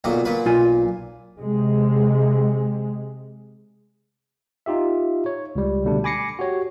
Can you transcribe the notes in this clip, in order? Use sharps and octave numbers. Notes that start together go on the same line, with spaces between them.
B1 A#2 F#4
A#2 B4
B1 F4 G#5
C3 G#3
D#4 F4 G4 E5
C#5
C#2 G3
B2 D3 G3 A3 D4
G#5 B5 D6 A#6 C7 C#7
F#4 G4 C#5